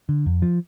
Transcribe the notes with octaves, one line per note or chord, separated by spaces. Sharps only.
D3
F2
F3